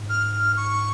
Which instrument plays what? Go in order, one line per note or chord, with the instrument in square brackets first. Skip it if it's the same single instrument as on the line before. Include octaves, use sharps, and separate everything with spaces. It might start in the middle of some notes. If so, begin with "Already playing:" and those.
Already playing: [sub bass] G#2
[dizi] F6
C#6